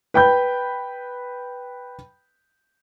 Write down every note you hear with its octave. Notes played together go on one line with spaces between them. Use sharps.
B4 G5 B5 G6